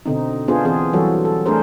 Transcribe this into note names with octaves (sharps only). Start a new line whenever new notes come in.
B2 D3 C4 D#4
B3 D4 F4 G#4 C5
E3 C4 G#4
E3 F#3 G3 F#4 A4
A4
A3 D4 G#4 A#4 C5